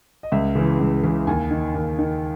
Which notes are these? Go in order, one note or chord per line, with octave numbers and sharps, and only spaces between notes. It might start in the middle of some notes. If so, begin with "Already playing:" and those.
D#5
C#2 E5
C#3 E3
C#2
C#3 E3
D#2 G#5
D#3
D#2
D#3